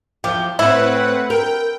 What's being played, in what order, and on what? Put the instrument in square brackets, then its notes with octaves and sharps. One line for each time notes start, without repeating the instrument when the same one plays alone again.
[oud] E2 F3 [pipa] G4
[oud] A2 [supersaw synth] C4 B4 F#5 [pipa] E4
[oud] A#4 [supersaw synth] G5